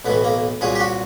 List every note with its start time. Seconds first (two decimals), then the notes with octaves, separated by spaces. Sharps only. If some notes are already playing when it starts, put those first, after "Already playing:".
0.05 B1 A2 E3 B3
0.24 A#3
0.61 C2 A#2 F#3 G#4
0.75 G4
0.80 F#4